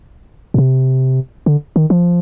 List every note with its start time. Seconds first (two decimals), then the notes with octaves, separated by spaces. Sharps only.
0.54 A#2
0.58 C3
1.46 D3
1.76 D#3
1.90 F3